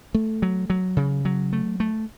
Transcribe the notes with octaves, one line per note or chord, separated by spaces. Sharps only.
A3
F#3
F#3
C#3
F#3
A3
A3